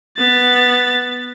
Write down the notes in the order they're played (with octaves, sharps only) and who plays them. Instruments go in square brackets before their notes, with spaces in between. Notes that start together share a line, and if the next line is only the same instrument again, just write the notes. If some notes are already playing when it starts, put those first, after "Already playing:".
[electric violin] B3 A6